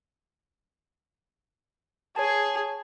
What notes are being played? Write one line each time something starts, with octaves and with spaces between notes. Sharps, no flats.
G#4 C#5 A5